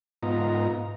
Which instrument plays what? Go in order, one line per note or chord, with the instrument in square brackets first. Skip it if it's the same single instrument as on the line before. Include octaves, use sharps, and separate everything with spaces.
[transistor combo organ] G#2 B3 F4 D#5 A#5